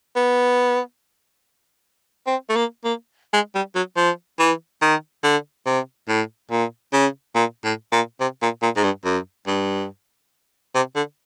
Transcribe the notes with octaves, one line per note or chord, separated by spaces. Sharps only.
B3
C4
A3
A#3
A#3
G#3
G3
F#3
F3
E3
D#3
D3
C3
A2
A#2
C#3
A#2
A2
A#2
C3
A#2
A#2
G#2
G2
F#2
G2
C3
D3